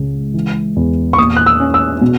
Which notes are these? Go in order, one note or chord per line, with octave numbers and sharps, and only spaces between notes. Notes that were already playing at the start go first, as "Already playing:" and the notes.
Already playing: C#2 C#3
E3
E2
C#6
A#2 D#6
F#6
E6
C#4
E6
B2